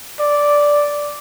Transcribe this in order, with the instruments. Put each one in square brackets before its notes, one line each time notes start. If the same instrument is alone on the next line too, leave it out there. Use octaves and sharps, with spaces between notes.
[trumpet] D5